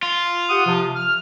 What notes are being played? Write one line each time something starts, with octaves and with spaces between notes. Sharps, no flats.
F4
G4 F#5 D#6
C3 F3
F6